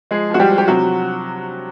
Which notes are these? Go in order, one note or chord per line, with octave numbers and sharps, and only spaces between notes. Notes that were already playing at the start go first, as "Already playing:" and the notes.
F3 G#3 G#4
F3 F#4
G3 G4
F3
G4
C3 F#3 F#4